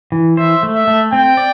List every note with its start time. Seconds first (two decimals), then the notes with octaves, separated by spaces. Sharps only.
0.12 E3
0.37 C5 E5
0.63 A3
0.75 E5
0.88 A3
1.13 C4 G5
1.37 D5